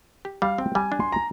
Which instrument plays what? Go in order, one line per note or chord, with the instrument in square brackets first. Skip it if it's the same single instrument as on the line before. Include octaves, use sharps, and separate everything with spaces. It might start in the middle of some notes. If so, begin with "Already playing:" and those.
[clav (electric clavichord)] G4
[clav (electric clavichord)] G3 [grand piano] F5
[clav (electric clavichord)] C4 [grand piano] G5
[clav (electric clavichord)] G3 [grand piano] G#5
[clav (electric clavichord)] D4
[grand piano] C6
A#5